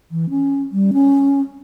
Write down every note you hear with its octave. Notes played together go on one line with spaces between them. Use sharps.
E3
C#4
G3
C#4